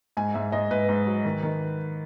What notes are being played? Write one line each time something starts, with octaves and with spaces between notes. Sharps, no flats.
G#2 G#5
G#2 E5
G#2 D#5
G#2 B4
G#2
F#3
D#3
D#3